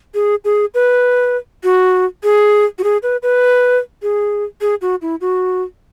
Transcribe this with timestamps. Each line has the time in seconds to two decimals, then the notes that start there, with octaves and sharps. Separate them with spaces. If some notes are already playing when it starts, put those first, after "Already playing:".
0.14 G#4
0.45 G#4
0.74 B4
1.63 F#4
2.23 G#4
2.78 F#4
2.83 G#4
3.03 B4
3.23 B4
4.02 G#4
4.61 G#4
4.81 F#4
5.02 E4
5.21 F#4